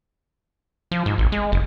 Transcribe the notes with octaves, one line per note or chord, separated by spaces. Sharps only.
F3
G#2
A1
G#3
F#1